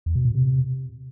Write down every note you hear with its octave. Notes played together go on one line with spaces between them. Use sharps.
E2
B2
A#2
C3